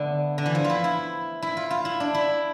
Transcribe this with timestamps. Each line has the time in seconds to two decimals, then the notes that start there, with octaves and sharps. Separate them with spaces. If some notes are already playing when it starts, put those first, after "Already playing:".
Already playing: D3 A3 B3
0.38 D3
0.46 E3
0.55 F3
0.64 F4
0.70 E4
0.84 E4
1.42 E4
1.57 F4
1.70 F4
1.85 E4
2.00 D4
2.14 E4